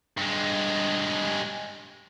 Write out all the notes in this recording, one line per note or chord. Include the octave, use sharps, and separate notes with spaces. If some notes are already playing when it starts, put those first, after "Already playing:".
G2 G#3